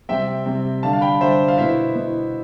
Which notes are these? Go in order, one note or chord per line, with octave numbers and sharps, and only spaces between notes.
C3 G3 C4 E5 G5
C3 G3 C4
D3 G3 D4 F5 A5
F5 A5
G5 B5
D3 G3 D4 C5 E5
F5
B2 B3 E4 C5 E5
B2 B3 E4